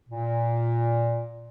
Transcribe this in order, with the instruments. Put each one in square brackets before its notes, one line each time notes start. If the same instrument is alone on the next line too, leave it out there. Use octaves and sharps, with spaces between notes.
[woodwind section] A#2